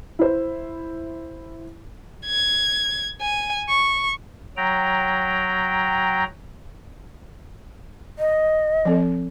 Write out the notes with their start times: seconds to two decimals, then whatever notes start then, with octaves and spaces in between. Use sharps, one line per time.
0.19 E4 C5
2.25 G#6
3.21 G#5
3.69 C#6
4.57 F#3 G5 A#5
8.19 D#5
8.85 F3 C4 A4